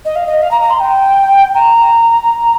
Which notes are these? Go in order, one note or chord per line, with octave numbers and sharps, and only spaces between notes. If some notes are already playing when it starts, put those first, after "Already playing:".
D#5
F5
D#5
F5
A#5
A#5
C6
G5
A#5